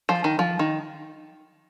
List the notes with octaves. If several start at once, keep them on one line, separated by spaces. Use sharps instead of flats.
F3
D#3
F3
D#3